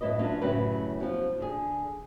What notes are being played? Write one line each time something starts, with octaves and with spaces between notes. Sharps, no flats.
F#2 A2 E4 B4 D#5
F#3 C#4 D4 F4
F#2 A2 C#3 F#3 G4 B4
B2 F3
D3 G#4